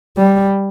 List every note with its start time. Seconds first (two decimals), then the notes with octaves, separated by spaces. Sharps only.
0.17 G3